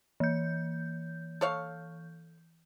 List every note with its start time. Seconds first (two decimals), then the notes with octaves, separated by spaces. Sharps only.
0.20 E3 G6
1.41 A4 C#5 F5